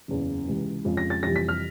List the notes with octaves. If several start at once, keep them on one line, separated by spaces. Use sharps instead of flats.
F#1 E2 C#3
C#2 C3 E3
F2 C#3 F3 G#3
A#6
A6
F2 C3 E3 G3 A#6
B6
F6